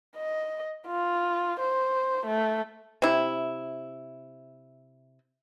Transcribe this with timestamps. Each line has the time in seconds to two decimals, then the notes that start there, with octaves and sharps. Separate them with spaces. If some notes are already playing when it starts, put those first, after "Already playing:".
0.17 D#5
0.87 F4
1.60 C5
2.26 A3
3.02 C3 E4